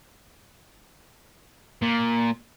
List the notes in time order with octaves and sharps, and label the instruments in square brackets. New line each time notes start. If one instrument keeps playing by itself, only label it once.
[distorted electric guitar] A#2